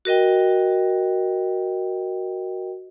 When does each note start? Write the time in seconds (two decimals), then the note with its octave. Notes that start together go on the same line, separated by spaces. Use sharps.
0.05 F#4 A#4 D#5 G5